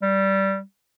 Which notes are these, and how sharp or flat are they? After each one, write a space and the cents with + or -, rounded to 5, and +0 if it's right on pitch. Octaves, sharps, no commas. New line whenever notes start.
G3 -10